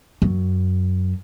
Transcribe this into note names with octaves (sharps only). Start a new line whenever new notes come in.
F#2